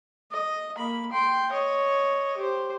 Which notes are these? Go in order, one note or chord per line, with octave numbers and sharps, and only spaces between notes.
D#5
A#3 B5
G5 C6
C#5 D#5
G4 C5